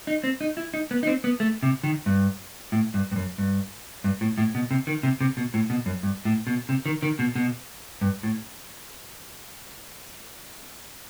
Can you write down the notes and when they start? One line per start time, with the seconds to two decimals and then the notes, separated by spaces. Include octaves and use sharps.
0.07 D#4
0.24 C4
0.41 D#4
0.57 E4
0.74 D#4
0.91 B3
1.03 D#4
1.07 C4
1.24 B3
1.40 A3
1.63 C3
1.84 D#3
2.06 G2
2.72 A2
2.94 G2
3.12 G2
3.16 F#2
3.38 G2
4.04 G2
4.21 A2
4.38 A2
4.55 B2
4.71 C3
4.87 D#3
5.03 C3
5.21 C3
5.37 B2
5.54 A2
5.70 B2
5.86 F#2
6.03 G2
6.25 A2
6.47 B2
6.69 C3
6.86 D#3
7.03 D#3
7.19 B2
7.35 B2
8.01 G2
8.23 A2